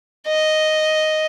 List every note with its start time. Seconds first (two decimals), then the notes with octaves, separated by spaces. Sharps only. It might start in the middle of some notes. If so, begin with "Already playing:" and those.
0.27 D#5